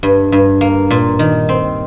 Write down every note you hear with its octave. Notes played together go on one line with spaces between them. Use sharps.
G2
G2
A#3
A#2
D#3
C4